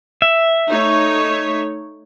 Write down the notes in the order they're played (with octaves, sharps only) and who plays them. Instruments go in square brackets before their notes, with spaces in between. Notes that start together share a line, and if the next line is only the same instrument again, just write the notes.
[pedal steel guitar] E5
[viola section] A3 D#4 C#5